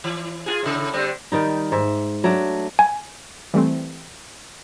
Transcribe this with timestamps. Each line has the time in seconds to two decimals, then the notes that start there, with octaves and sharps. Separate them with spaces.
0.04 E3
0.46 F4 F#4 G#4
0.63 A2 C#3
0.93 D3 G3 C4
1.32 D#3 G3 D#4
1.72 G#2 E5
2.24 F#3 A3 D4
2.79 G#5
3.54 E3 G3 A3 C4